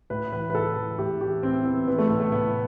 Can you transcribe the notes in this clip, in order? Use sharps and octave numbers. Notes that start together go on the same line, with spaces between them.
A2 B4
E3 B4
B4
A2 A4
E3
A2 G4
E3 G4
E3 C4
E3 B3
E3 B3
A3
A2
A3
A2 B3